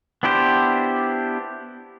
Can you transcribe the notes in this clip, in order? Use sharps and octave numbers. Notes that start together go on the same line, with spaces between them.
B3 D4 E4 G4 C5